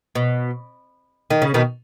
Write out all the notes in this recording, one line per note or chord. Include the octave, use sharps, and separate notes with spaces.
B2
D#3
C#3
B2 D#3